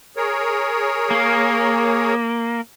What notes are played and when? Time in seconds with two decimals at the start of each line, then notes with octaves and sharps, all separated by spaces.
0.17 G#4 A#4 C#5
1.11 A#3